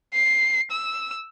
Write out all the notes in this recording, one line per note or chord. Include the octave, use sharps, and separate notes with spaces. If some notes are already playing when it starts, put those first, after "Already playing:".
C7
E6